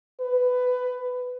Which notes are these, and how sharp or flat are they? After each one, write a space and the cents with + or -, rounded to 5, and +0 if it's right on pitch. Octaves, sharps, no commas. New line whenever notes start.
B4 +15